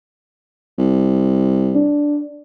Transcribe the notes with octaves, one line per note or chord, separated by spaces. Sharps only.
C2
D4